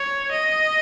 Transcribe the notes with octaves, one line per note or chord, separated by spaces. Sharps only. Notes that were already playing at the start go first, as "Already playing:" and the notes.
Already playing: C#5
D#5